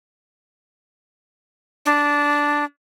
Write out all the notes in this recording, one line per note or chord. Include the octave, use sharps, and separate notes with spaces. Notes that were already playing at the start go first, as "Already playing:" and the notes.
D4